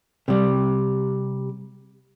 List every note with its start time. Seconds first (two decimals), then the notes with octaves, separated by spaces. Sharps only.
0.28 C3 G3